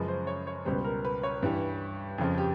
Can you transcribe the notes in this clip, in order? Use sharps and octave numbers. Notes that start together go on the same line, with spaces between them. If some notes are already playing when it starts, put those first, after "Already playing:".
Already playing: F#2 C#3 F3 G#3 B4
C5
C#5
C#5
C#2 B2 G3 C5
A#4
B4
C#5
G2 E3 G3
F2 C#3 F3
G4